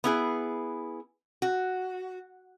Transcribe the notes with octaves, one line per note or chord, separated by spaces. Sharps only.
B3 E4 G#4
F#4